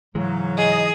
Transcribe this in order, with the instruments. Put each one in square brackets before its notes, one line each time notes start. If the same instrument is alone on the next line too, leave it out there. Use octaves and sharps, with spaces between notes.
[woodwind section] G#2 C#3 F#3 [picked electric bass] E3 G#3
[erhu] G#4 [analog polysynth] D#5